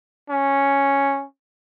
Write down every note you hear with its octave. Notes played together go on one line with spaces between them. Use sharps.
C#4